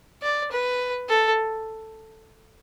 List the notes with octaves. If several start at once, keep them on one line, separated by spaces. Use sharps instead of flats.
D5
B4
A4